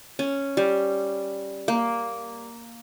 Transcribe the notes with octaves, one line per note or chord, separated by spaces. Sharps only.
C#4
G3
A#3